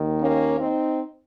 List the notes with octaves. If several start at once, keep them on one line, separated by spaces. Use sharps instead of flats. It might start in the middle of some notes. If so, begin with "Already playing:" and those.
Already playing: D#2 D#3
A#3 C#4
C4 D#4